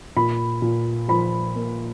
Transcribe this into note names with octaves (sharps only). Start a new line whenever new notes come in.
A#2 B5
A#2
F3 B5
A#3